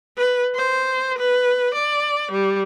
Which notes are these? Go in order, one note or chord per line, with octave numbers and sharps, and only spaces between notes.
B4
C5
B4
D5
G3